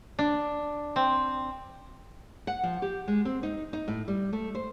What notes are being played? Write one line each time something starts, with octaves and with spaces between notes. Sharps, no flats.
D4
C4
F#5
F3
G4
G#3
C4
D#4
D#4
A2
G3
A3
C5